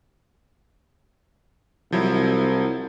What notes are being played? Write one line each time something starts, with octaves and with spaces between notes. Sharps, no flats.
C2 F3 F#3 E4